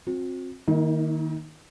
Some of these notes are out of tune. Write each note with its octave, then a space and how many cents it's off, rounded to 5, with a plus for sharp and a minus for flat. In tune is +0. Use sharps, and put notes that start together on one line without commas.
C4 +20 F#4 -45
D#3 +0 A#3 +0 E4 -45